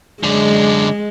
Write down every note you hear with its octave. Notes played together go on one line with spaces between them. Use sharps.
F#2 D3 G#3